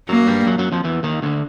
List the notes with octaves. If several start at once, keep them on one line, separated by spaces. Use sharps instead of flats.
F#2 F#3 A#3
G2 G3
F#2 F#3
F#2 F#3
F2 F3
E2 E3
D#2 D#3
D2 D3